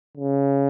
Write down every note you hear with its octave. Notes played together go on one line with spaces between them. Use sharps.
C#3